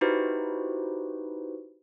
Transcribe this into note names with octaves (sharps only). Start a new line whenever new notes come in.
D#4 E4 F#4 G4 B4 C5